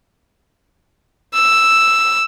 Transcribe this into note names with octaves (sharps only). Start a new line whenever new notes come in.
E6